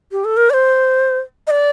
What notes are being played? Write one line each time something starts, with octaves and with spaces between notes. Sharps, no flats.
G4
A4
A#4
D5
C5
D#5
D5